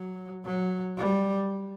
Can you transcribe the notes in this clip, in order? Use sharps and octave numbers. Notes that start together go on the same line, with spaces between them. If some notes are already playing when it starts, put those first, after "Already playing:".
Already playing: F#3
F#3
G3